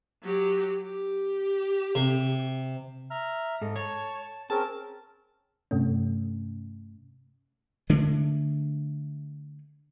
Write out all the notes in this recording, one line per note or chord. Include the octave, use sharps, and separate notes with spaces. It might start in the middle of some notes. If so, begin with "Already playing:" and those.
F#3 G4
G4
C3
E5 A#5 F6
G#2 A4 D#5
C#5 A5
C4 C#4 G#4 A#4 A5
G2 C3 A3 C#4
D3 G#3 A3 D4